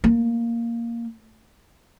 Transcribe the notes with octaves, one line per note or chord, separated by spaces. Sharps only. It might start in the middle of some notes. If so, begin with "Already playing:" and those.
A#3